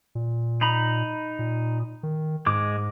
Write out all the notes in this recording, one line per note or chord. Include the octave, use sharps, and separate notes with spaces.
A#2
D#4 A#5 B5
A#2
D#3
G#2 G#3 D6